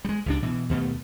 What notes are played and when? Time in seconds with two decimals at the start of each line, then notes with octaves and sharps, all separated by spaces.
0.05 G3 G#3
0.26 C#2 C3 D4
0.43 B2 E3
0.69 D#2 B2 G#3 A3